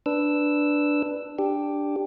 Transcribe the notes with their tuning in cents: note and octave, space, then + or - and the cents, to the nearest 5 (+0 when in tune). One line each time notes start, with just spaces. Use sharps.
D4 +0 B4 +0 E6 +0
D4 +0 G4 +5